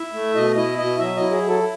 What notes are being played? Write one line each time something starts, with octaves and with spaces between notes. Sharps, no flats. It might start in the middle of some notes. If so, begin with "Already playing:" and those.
Already playing: E4 E5
A3
B2 D#5
E4 D#5
B2 D#5
F#3 E5
D#5
E4
G#4
F#3
A4